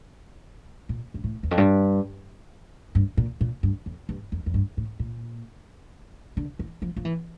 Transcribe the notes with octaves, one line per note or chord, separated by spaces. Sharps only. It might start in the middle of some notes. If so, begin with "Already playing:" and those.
A#2
G2
A2
E2
F2
G2
G2
A#2
A#2
G2
F2
G2
F2
F2
G2
A2
A#2
D3
E3
F3
F3
E3